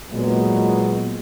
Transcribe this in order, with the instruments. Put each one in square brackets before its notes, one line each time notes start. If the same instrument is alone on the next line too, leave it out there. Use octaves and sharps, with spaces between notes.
[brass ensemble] A#2 F#3 G#3 B3